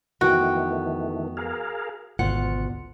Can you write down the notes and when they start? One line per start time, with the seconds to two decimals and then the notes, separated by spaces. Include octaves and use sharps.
0.21 F2 D#3 E3 A3 B3 F#4 G5
1.37 G#4 A#4 F5
2.19 G#1 D2 B2 F4 F#5 C#7